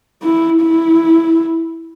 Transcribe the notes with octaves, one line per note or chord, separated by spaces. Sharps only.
E4
E4